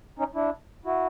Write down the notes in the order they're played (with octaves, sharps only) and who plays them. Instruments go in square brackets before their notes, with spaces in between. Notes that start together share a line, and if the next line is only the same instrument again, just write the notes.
[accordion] C#4 D#4
D4 E4
E4 F#4